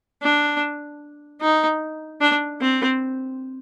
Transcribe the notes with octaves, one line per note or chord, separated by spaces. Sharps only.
D4
D#4
D4
C4